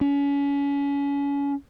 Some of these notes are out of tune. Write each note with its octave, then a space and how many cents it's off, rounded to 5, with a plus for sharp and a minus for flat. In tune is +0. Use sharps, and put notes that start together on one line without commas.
C#4 +30